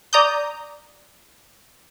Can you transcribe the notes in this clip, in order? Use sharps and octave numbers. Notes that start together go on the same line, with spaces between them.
D5 A#5 D#6 G6